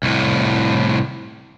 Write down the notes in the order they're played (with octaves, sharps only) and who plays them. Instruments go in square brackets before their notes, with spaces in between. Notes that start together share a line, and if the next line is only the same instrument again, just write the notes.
[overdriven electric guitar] C2 A2